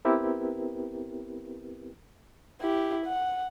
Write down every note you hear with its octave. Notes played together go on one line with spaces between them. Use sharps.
B3 C4 E4 G4 A#4 B4
E4 G4
F#5